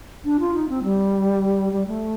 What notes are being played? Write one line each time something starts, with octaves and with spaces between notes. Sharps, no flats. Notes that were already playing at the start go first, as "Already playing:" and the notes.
D4
F4
D#4
C4
G3
G3
A3